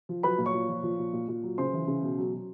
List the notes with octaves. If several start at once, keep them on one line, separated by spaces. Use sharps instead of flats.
F3
F#3 B4 B5
A#2
C#5 C#6
A#2
F3
F3
A#2
A#2
A#2
F#3
C#3 C5 C6
E3
C#3
B2
F#3
F#3